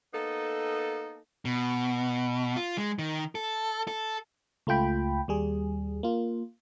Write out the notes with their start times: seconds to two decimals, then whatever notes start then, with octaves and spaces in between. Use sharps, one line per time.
0.14 A#3 B3 D#4 A4
1.45 B2
2.56 F4
2.78 G#3
2.99 D#3
3.35 A4
3.88 A4
4.67 C#2 A3 F4 G5 B5
5.28 D#2 G3 G#4
6.03 A#3 F4